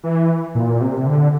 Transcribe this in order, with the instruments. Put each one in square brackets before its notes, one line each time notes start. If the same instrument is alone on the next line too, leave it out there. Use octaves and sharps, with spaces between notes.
[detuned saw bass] E3
A#2
C3
D3